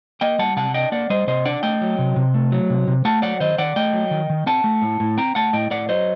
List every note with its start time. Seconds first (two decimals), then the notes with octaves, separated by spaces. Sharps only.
0.21 A#3 D#5 G5
0.39 G3 F#5 A5
0.57 C3 F#5 A5
0.74 D4 D#5 G5
0.92 A#3 D5 F#5
1.10 G3 C5 D#5
1.27 C3 C5 D#5
1.46 D4 D5 F#5
1.63 A3 D#5 G5
1.81 F#3
1.99 C3
2.16 C3
2.34 A3
2.52 F#3
2.70 C3
2.88 C3
3.05 A3 F#5 A5
3.22 F#3 D5 F#5
3.40 D#3 C5 D#5
3.58 D#3 D5 F#5
3.76 A3 D#5 G5
3.93 F#3
4.11 D#3
4.30 D#3
4.46 C4 F#5 A5
4.64 A3
4.82 A2
5.00 A2
5.18 C4 G5 A#5
5.35 A3 F#5 A5
5.53 A2 D#5 G5
5.71 A2 D5 F#5
5.89 F#3 C5 D#5